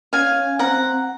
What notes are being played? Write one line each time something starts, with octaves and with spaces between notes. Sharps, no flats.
C#4 F5 G#5
C4 F#5 A#5